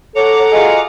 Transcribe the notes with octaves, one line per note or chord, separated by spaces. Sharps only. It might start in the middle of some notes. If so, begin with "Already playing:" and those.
A4 C#5 F#5 A#5 D6
F4 F#4 G#4 D#5